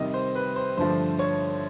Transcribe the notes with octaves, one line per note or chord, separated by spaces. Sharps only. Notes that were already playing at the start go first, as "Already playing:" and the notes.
Already playing: C3 D#3 G3 D#5
C5
B4
C5
G2 D3 F3 A3 C5
C#5